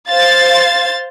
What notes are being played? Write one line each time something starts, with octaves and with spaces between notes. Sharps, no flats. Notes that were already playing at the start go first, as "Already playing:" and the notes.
C5 F5 C6 A6